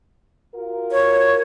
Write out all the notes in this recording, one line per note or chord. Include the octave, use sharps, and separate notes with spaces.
F4 F#4 A#4
C#5